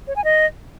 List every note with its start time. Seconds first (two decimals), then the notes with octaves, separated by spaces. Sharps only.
0.08 C#5
0.16 G#5
0.24 D#5